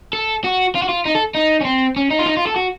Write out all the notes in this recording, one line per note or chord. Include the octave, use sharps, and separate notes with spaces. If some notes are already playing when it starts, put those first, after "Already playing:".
A4
F#4
F4
F#4
F4
D#4
A4
D#4
C#4
C4
C#4
D#4
F4
D#4
F4
A4
F#4